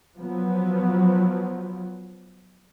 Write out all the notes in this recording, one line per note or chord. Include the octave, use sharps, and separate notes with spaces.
F3 F#3 B3